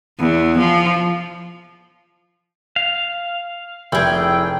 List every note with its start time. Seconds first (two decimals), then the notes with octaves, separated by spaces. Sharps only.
0.19 E2
0.58 F3
2.76 F5
3.92 F1 E4 G#4 G5